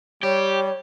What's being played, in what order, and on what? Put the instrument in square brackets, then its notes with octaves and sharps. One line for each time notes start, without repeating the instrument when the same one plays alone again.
[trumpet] G3 [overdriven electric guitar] G4 [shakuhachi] C#5